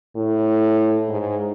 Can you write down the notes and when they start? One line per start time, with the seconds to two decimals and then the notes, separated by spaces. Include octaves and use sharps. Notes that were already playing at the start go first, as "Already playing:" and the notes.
0.16 A2
1.09 G#2